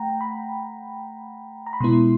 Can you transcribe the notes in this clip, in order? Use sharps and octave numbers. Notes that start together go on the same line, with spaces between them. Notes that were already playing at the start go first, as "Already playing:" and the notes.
Already playing: A3 F#5 G5 A#5
B5
A#5
B5
B2 G#3 B3 E4 C6